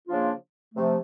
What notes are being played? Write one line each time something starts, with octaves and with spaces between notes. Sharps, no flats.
C#3 F3 A#3 D4 F4
C3 F3 A3